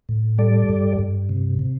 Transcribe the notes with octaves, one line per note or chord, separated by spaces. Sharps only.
A2
G3 A4 D5
G2
G2
C3
C3